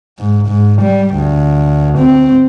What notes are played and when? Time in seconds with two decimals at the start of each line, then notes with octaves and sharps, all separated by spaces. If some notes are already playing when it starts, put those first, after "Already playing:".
0.19 G#2
0.48 G#2
0.82 G3
1.15 D2
1.98 C4